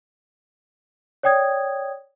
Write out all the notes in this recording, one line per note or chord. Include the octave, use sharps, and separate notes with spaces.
C#5 D5 G5 D#6 G#6